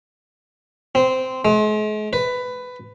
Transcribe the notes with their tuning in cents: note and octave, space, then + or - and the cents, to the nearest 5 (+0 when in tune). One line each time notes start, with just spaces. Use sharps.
C4 -10
G#3 +40
B4 +15